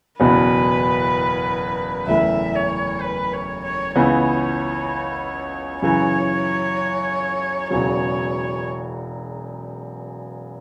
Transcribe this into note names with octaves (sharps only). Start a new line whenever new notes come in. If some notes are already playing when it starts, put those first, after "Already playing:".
F#1 E2 B2 B3 E4 B4
F#1 E2 E3 A3 E5
C#5
B4
C#5
C#5
C#2 C#3 E3 B3 C#5
F#2 C#3 E3 C#5
E1 E2 C#3 F#3 C#5